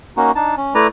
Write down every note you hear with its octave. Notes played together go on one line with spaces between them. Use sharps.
A#3 C#4 D#4 F#4
D4 D#4 A5
C#4
A3 E4 B4 D5 A#5